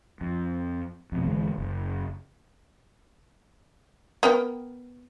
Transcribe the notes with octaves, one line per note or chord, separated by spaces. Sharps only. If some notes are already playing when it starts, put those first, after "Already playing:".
F2
F2 B2
G1 D3 E3 G#3
F#1
B3 A#4 G5